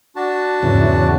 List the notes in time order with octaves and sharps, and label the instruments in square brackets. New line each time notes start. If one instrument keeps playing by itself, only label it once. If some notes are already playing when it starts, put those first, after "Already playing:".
[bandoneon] D4 F#4 A5
[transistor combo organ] E2 C#3 [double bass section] G#2 E3